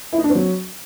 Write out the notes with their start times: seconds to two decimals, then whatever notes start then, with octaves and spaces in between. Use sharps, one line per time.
0.13 E4
0.18 D#4
0.24 D4
0.30 C4
0.35 F#3